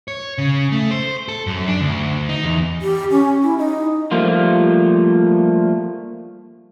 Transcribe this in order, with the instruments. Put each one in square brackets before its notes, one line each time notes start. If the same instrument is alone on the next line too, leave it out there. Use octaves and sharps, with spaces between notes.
[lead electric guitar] C#5
C#3
A3
C5
A4
F#2
D4
D2
D#4
E2
[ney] G4
C#4
E4
D#4
[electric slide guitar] F3 G3 A3 A#3 F4